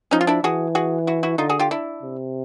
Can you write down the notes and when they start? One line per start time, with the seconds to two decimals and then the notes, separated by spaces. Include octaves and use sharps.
0.11 F3 C#4 D#4
0.21 F4
0.27 D4 E4
0.43 E3 F#4 G#4
0.75 F#4 G#4
1.07 E4 F#4
1.23 E4 F#4
1.38 D3 D#4 F4
1.49 F#4 G#4
1.59 F4 G4
1.71 D4 E4
2.03 C3